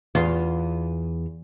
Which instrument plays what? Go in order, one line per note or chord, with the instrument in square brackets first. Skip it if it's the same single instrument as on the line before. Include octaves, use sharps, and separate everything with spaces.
[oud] E2 F4